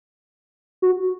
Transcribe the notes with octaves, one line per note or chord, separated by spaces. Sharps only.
F#4